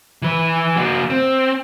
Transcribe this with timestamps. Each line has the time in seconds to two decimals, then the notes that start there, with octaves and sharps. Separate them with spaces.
0.22 E3 B4
0.77 A#3 F#4
1.10 C4